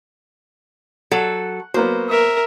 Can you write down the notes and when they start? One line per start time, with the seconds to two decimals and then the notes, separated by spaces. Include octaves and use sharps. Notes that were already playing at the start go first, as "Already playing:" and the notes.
1.11 F#3 A4 F#5
1.74 F#3 A#3 B3 C5
2.09 A#4 E5